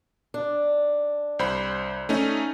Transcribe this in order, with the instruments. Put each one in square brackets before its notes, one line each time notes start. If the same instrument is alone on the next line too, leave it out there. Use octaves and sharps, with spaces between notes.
[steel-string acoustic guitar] D4
[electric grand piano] C2 C5 B5
A3 C#4 D#4